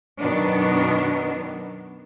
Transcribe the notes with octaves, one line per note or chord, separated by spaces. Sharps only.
F#2 B2 D#3 B3 D4